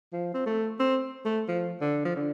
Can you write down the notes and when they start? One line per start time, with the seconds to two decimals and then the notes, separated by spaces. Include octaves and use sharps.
0.13 F3
0.34 C4
0.46 A3
0.79 C4
1.25 A3
1.48 F3
1.81 D3
2.05 F3
2.15 D3